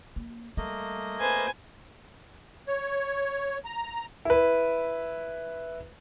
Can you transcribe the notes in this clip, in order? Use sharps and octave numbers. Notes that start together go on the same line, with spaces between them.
A#3
G3 A3 A#3 D#5
B4 C5 G#5
C#5
A#5
E4 B4